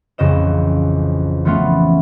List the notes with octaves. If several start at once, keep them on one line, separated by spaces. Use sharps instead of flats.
A1 F2 C#3 D#5 E7
E3 F3 A3 B3 C#4 F4